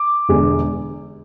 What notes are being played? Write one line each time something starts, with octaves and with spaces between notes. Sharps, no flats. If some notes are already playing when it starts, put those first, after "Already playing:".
Already playing: D6
E1 E2 D3 G#3